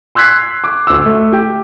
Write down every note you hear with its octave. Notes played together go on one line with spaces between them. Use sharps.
C6 E6 F#6 G#6 B6 C7
D6
D2 E6
A3
G4 G5